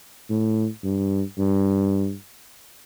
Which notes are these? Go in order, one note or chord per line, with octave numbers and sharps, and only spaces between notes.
A2
G2
G2